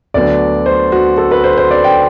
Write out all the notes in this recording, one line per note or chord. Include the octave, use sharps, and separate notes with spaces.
D2 D3 F#3 B3 D4 D5
C5
F#4
A4
B4
C5
C5
D5
G5